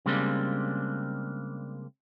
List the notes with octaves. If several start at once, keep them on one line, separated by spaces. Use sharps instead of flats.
C#3 G3 G#3 A#3 C4 D4